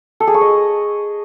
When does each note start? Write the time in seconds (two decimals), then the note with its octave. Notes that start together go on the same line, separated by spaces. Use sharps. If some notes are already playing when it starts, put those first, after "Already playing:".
0.20 A4
0.27 G#4
0.34 C#6
0.41 D#5